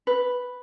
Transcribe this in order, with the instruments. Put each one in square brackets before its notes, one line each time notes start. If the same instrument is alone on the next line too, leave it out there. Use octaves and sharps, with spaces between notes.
[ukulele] B4